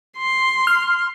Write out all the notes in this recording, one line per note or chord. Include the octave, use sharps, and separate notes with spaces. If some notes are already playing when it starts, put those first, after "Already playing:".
C6
F6